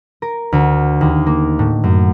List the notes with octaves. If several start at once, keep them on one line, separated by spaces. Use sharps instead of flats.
A#4
D2
D#2
A#3
A2
F#2